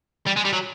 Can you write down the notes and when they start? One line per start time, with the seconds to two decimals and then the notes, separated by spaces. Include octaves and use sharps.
0.26 G3
0.36 G#3
0.45 G3
0.53 F#3